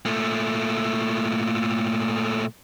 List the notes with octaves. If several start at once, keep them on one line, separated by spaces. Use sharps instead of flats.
A#2 A3